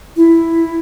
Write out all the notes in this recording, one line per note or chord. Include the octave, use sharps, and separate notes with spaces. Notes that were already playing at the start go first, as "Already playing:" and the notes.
E4